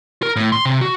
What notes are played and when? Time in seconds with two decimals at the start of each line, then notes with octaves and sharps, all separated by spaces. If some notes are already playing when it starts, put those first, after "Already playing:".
0.23 A#4
0.36 A2
0.52 C6
0.65 C3
0.81 F#4